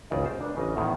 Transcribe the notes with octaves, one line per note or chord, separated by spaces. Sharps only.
G#1 C#2 C#3 D5 D#5
C5
D4 A#4 B4
A1 C#3 D#5
E2 A2 D#3